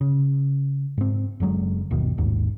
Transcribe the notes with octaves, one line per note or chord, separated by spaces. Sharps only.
C#3
G#2 C4
F#1 D3 F#3 G#3
G1 D#2 B2 D#3
A1 D#2 G#2